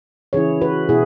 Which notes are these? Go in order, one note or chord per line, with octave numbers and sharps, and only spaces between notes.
C#3 E3 C#4 E4 G#4 C#5
F#4 B4
B2 B3 E4 G#4